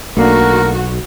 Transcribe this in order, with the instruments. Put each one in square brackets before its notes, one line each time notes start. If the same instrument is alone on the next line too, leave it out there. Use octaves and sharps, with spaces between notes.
[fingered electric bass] B1 [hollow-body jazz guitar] A3 A#3 D4 [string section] F#4 [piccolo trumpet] A#4